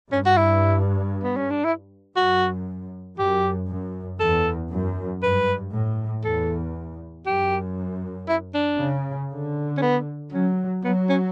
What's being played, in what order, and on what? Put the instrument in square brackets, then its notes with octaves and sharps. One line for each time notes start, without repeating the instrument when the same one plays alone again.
[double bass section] G2 [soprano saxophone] C#4
[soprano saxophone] F#4
E4
B3
C#4
D4
E4
[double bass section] F#2 [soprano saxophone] F#4
[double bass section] F#2 [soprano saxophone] G4
[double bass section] F#2
[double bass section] E2 [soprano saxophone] A4
[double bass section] F#2
[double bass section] G2 [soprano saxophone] B4
[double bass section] A2
[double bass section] E2 [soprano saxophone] A4
[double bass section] F#2 [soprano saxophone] G4
[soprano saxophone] E4
D4
[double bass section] C#3
D3
[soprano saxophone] C#4
B3
[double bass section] F#3 [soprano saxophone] C#4
[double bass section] F#3 [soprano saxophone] B3
[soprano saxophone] C#4